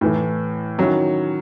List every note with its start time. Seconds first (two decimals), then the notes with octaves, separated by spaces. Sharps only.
0.01 A2 E3 A3
0.78 D#3 F#3 C#4 E4